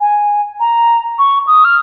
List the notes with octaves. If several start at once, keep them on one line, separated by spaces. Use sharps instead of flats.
G#5
A#5
C#6
D#6
F6